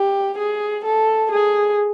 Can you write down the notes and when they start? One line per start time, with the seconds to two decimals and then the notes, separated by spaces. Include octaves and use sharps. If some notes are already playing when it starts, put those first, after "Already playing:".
Already playing: G4
0.38 G#4
0.84 A4
1.31 G#4